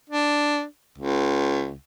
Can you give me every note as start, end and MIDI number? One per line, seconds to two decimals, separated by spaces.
0.10 0.64 62
0.98 1.75 37